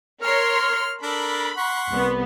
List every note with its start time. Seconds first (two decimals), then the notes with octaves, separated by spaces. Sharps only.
0.22 A#4 C#5 C6 F6
1.03 D4 A4 A#4 B5
1.57 F#5 C6 C#6
1.90 C2 B3